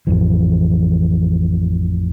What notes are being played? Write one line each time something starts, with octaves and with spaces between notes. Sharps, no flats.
A1 F2 E3